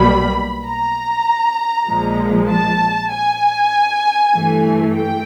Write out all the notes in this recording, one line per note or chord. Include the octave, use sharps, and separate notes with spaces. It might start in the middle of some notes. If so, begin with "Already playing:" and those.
Already playing: B1 B2 G3 A#3 B5
A#5
A#1 A#2 F3 G#3
A5
G#5
G2 E3 A3
G5